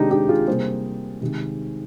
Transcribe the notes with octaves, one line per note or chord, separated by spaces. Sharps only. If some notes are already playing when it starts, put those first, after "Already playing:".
Already playing: C3 D#3 G#3 D4 D#4 G4
D#4 G4
F4 G#4
C3 G3 A#3 G#4 C5
C3 D#3 G#3